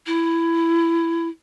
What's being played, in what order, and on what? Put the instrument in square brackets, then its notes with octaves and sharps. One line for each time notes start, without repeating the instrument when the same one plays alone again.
[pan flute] E4